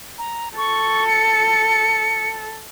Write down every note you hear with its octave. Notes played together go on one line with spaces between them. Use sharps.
A#5
A4 C#6
C#7